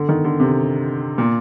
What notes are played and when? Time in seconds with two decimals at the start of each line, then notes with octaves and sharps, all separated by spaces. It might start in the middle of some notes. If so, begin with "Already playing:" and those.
Already playing: D3
0.09 D#3
0.24 D3
0.40 C3
1.18 A#2